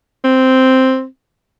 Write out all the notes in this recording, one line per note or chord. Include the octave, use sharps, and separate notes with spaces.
C4